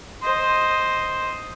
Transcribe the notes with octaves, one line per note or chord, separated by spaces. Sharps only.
C5 D#5